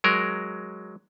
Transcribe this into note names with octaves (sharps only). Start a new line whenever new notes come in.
F#3 G#3 A#4